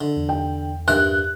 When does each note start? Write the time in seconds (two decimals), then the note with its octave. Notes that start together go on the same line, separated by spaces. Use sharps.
0.01 D3
0.17 E2
0.29 G5
0.88 G2 A#4 E5 F#6